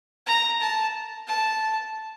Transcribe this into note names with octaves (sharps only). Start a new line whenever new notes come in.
A#5
A5
A5